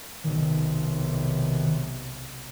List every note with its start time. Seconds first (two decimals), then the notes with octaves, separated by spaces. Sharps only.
0.24 B1 C3 D#3